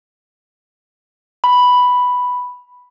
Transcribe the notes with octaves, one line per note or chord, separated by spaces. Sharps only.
B5